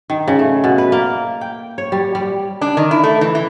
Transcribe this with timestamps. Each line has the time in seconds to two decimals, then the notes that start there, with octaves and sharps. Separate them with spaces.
0.10 D#3
0.28 C#3
0.39 A3
0.64 B2
0.78 B4
0.92 A#3
1.41 G5
1.78 C#5
1.92 G3
2.15 G3
2.61 D4
2.77 D#3
2.91 E4
3.03 A3
3.21 E3
3.35 E3